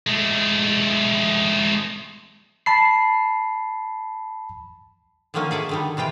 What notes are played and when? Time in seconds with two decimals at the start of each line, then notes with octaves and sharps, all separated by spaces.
0.07 G#3 A3
2.66 A5 B5 C7
5.34 D3 D#3 F3 F#3 A#3 C#4
5.51 G#4 A4 D5 E5
5.69 D3 D#3 G3
5.97 C3 E3 F4 G5